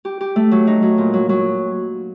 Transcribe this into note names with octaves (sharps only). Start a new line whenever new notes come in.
G4
G4
A3
F#3
D#4
F#3
A#2
F#3
F#3